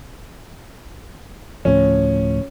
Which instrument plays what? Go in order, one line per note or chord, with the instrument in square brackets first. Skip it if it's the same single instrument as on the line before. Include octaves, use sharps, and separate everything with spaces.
[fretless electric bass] D2 A2 F3 [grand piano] C#4